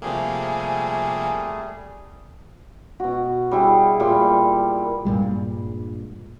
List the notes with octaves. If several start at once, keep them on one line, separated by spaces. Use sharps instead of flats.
C3 F3 G3 A3 A#3 G#4 G#5
B2 F#4
G3 E4 G#4
A#2 G3 C6
G2 A#2 G3 G#3